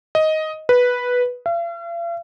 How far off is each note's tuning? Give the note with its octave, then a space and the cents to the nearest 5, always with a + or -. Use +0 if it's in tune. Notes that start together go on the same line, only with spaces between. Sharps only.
D#5 +10
B4 -5
F5 -45